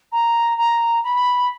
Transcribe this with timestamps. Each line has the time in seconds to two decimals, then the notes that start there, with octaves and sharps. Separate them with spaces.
0.12 A#5
0.58 A#5
1.04 B5